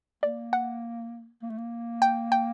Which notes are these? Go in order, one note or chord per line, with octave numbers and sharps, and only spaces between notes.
A#3 D5
F#5
A#3
A3
A#3
G5
G5